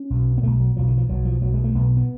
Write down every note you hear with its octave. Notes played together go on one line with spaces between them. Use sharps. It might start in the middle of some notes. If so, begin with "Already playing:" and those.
Already playing: C#4
B1 B2
B3
B1 B2 A3
F#3
B1 B2 F3
D3
F3
B1 B2 F#3
F3
B1 B2 F#3
G#3
A3
B1 B2 B3
B3